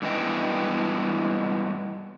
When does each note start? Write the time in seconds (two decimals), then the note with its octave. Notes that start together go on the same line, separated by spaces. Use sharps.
0.02 G2 E3 G#3 B3 D#5 G5